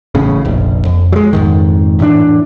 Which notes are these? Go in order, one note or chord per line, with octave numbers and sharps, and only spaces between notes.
A1 A2 C#3
F1 A#1
F2
F#3 G#3
F2 G#2 D#3
A2 E3 C#4 D4